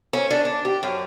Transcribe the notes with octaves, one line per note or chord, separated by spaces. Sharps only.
C#4
D4
D4
G4
F#2